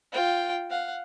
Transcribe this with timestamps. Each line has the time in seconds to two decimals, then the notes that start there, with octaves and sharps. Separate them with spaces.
0.12 F4 G5
0.70 F5 F#5